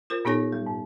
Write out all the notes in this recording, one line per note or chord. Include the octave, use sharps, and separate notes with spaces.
F4 A#4 C5
A#2 B3 D#4 A4 C#5 A#6
G3
G#2